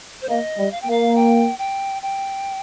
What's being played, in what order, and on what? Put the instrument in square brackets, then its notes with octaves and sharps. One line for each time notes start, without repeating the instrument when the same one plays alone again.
[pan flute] C5
[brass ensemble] A#3 [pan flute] D#5
[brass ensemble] G3
[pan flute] F5
G5
[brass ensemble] A#3 [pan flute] F5
[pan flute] G5
G5
G5